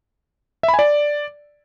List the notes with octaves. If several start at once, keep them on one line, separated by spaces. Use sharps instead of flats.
E5
B5
G#5
D5